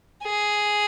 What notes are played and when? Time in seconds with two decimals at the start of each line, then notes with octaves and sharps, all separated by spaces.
0.24 G#4